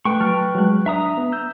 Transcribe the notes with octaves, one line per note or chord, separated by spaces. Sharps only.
A3 B4 G5 C#6
F#3 A5 F6
F#3 G#3 F#6
D4 E5 A#5 D#6
B3
E6 G6